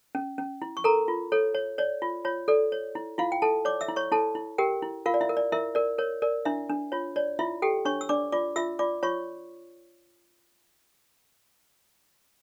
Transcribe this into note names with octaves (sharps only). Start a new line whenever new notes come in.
C#4
C#4
E4
C#6
A4 A#4 A#5
F4
A4 C#5
C#5
C#5 D5
F4
F4 C#5
A4 D5
C#5
E4
E4 F4 F5
G5
E4 A4 A5
C#5 D5 D6
E5 E6
E4
C#5 C#6
E4 A4 A5
E4
G4 A#4 G5
E4
F4 A#4 F5
D5
E4 E5
A#4
D5
E4 A#4 E5
A#4 D5
A#4 C#5
A#4 D5
D4 E4 E5
D4
F4 C#5
C#5 D5
E4 F4 E5
G4 A4 G5
D4 C#5 C#6
E6
D4 D5 D6
F4 D5 D6
F4 E5 E6
F4 D5 D6
F4 C#5 C#6